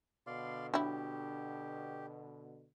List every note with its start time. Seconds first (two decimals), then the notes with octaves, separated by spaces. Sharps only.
0.27 B2 D3 D5 F5 C6
0.74 F#3 D4 E4 G4